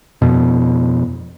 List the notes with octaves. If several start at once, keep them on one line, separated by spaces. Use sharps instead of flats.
F2 B2